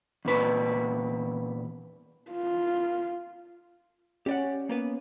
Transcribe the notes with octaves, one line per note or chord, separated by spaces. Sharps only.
E2 A#2 B4
F4
C#4 G4 D5 F#5
A#3 B3 B4